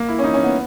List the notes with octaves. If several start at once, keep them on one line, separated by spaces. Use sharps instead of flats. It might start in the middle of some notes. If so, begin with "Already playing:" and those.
Already playing: A#3
E4
C#4
D#4
C#4
B3